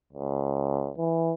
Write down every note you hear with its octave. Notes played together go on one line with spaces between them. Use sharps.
C#2
E3